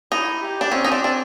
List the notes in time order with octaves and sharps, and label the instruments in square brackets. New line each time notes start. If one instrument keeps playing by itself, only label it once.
[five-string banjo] D#4 [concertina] E4
[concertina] G4
[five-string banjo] D4
[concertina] C4 [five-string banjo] C#4
[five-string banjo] D#4
D4
[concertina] C4 [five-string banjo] D4